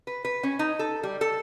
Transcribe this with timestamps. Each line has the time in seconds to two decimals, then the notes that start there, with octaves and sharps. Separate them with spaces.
0.07 B4
0.25 B4
0.43 C#4
0.59 D#4
0.79 A4
1.03 G3
1.21 A4